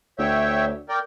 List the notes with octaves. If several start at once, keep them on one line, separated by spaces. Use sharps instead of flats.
D2 C#5 E5 G5
A#4 D5 G5